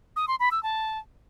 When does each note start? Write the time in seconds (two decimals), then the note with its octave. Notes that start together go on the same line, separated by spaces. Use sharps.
0.16 D#6
0.28 C6
0.40 B5
0.51 E6
0.63 A5